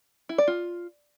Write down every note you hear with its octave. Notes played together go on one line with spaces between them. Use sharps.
E4
D5
F4